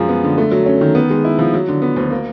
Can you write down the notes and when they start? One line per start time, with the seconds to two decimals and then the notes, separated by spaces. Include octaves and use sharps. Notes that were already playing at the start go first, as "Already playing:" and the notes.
Already playing: F#2 F3 G#3
0.09 B3
0.24 D3
0.38 A3
0.51 F#3
0.66 C#4
0.81 D#3
0.95 B3
1.10 G#3
1.25 E4
1.39 F3
1.54 F#3
1.68 D3
1.82 B3
1.96 D2
2.11 A#3